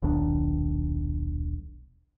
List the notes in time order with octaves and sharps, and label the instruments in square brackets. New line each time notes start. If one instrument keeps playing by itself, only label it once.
[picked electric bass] D#1 B1 D#3 D4